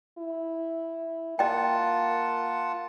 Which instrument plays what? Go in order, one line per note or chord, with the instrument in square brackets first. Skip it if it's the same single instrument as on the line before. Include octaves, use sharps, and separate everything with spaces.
[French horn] E4
[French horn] A#3 [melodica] F4 F#5 A5 [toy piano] D#5 G5